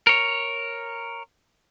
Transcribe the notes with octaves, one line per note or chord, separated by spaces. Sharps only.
A#4 C#5